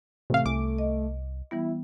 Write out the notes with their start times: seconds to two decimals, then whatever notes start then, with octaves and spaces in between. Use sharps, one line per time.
0.30 A1 C3 A3 F5
0.46 C2 G#5 D6
0.78 D#5
1.51 E3 G3 B3 E4